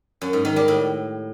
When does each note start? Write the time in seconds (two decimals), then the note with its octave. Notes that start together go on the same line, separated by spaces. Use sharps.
0.21 F#2
0.33 G#2
0.45 D#3
0.56 G3
0.68 A2